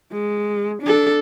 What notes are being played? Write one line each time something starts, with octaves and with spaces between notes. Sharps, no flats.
G#3
D4 A4